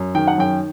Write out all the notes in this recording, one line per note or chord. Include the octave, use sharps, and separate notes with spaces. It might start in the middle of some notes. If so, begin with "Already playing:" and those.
Already playing: F#2
D#3 G5
F#5
F#2 G5